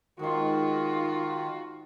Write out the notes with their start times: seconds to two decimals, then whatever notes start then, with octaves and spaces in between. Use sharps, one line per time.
0.19 G#2 D#3 F4 F#4 C6